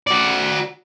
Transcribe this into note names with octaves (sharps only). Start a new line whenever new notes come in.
F#4 D5